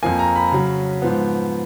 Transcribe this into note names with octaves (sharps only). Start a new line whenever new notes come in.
F2 F3 A#3 G#5
A#5
B5
C#3 F#3 C#4
G#2 F3 B3